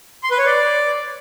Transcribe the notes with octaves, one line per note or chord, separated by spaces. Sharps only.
C6
B4
C#5
D5